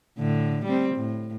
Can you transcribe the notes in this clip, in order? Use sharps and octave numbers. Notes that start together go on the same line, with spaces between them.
A2 D3
G3 C4
A2